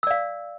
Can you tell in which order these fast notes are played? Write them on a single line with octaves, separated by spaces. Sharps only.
E6 D5 F5